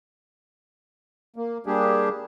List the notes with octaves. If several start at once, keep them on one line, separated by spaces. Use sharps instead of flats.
A#3
G3 A#3 D4 G4 G#4